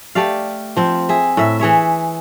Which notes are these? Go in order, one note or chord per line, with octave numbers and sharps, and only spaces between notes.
A3 G4 D5 F5
F3 C4
G#4 E5
A2 E5
E3 G#4 C#5 E5